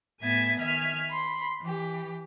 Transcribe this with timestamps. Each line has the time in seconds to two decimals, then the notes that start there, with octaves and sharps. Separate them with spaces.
0.20 A2 B3 E5 G#5 G#6 A6
0.59 D#3 E5 G#5 F6 G#6
1.10 B5 C6
1.61 E3 G4